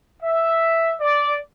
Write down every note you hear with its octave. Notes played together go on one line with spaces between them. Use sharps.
E5
D5